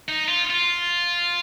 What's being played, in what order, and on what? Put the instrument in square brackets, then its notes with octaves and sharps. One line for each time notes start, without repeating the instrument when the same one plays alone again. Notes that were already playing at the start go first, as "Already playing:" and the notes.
[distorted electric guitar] D#4
F4
F4